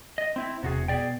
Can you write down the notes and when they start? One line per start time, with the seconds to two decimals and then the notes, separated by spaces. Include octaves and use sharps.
0.18 D#5
0.36 C4 E4
0.63 E1 C3 F#4 G#4
0.88 B2 G#4 D5 G5